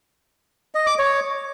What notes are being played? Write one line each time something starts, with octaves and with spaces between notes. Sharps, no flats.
D#5
D6
C#5